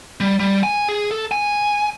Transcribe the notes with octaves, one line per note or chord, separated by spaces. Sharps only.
G3
G3
G#5
G#4
A4
G#5